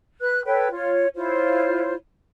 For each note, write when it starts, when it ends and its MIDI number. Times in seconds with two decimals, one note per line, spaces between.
0.22 0.43 71
0.22 0.43 90
0.46 0.68 69
0.46 0.68 71
0.46 0.68 73
0.46 0.68 79
0.71 1.06 65
0.71 1.06 73
1.16 1.95 64
1.16 1.95 65
1.16 1.95 72
1.16 1.95 73